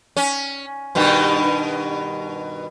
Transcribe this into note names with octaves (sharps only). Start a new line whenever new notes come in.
C#4
G2 B2 D#3